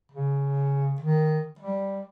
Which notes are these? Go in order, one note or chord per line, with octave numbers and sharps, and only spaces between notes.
C#3
D#3
G3